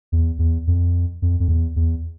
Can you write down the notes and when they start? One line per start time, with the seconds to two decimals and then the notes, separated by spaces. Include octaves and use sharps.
0.12 E2
0.39 E2
0.67 F2
1.22 F2
1.40 F2
1.48 E2
1.76 E2